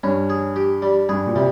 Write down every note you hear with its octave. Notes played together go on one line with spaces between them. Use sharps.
G2 C#4
G#4
G4
G3
G2 G#4
A#2
C3 G3